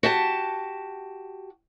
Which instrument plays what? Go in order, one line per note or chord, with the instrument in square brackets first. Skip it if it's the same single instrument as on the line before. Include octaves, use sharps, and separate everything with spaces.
[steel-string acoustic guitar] F#4 G4 A5